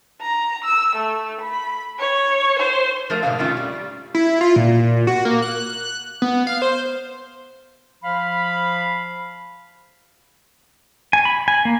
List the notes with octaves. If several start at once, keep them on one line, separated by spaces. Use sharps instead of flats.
A#5
E6
A3
B5
C#5
C5
F3 F#3 A3 A#4
G#2 B2 D3 E3 F5
F2 D#3 A3 C#4 F4
G3
E4
F4
A#2
F#4
A#3
F#6
B3
F5
C5
F3 F5 B5
G#5
B5
G#5
A#3